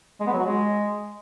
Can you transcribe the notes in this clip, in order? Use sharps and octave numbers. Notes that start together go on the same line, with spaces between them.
G#3
B3
F#3
F#4
G#3